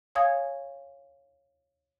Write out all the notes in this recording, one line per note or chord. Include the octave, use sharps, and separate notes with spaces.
C#5 F5 G#5 D#6 G#6